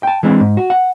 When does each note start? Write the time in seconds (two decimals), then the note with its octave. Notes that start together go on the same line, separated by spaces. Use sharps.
0.03 G5 A5
0.23 E3 G#3 C4 D4
0.41 G#2
0.57 F#4
0.70 F#5